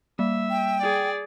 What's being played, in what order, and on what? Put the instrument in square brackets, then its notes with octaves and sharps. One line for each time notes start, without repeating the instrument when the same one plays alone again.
[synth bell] G3 A#3 [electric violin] E5
[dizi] G5
[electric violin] G#4 D5